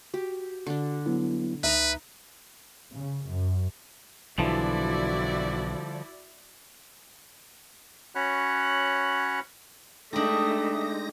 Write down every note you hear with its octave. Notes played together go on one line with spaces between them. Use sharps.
F#4 G4
D3 D4
F#3 B3 E4
C#2 D#4 B4 D#5 E5 A#5
C#3
F#2
B1 D3 E3 F3 G3 E4 F#4 D5
C#4 F#4 C#5 F#5 B5 F#6
G#3 A3 D4 D#4 G4 E5 D#6 A#6